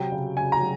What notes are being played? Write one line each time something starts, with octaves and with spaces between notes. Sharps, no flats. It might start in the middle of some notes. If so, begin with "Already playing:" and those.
Already playing: C3 F#3 G5
C#3
C#3 G#5
A#5
F#3